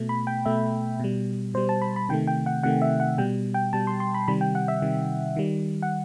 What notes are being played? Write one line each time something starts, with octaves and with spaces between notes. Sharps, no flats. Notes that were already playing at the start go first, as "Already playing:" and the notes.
Already playing: B2 A3
B5
G5
B2 A3 E5
B2 G3
B2 G3 C5
A5
B5
B5
C3 D#3 A3 G5
G5
F#5
C3 D#3 A3 F#5
E5
F#5
B2 G3 G5
G5
B2 G3 A5
C6
C6
B5
C3 D#3 G3 B5
G5
F#5
E5
C3 D#3 G3
D#3 G3
F#5